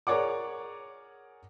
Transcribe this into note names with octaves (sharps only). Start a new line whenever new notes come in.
G#4 A#4 C#5 D5 F#5 D6